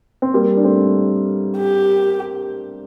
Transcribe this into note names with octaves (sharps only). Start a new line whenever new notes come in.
C4
G3 A#3
D4
A3 C4
G4